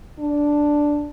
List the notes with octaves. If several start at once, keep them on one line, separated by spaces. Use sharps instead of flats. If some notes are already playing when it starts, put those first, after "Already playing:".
D4